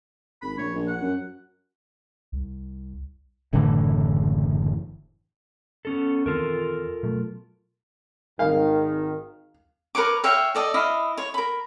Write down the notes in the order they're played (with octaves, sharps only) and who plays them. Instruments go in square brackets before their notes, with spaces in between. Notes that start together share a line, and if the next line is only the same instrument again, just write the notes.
[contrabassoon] G#1 [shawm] B5
[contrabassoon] A#1 [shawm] C#5
[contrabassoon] A#1
[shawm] F#5
[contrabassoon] F#2
[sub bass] C2
[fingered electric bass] F#1 A2 D3 E3
[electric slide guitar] B3 C#4 A4
[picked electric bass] E2 D#3 C4 [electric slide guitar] F4 A4 A#4
[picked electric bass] B2 F#3 A3
[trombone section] G#1 D#3 [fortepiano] F5
[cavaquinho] A#4 B4 C#5 D6
C#5 E5 F5 G5
A4 D5 D#5
E4 D#5 F5
C#5
A#4 B5